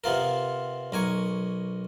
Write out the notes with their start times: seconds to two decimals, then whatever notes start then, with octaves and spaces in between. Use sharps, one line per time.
0.04 C3 B3 F4 A#4
0.92 B1 A#4 G#5 C#6